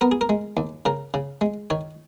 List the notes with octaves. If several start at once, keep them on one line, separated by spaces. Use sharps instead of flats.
B3 A#4
G#4
A#4
G#3
D#2
C#3 A#4
C#3
G#3
D#3 C#5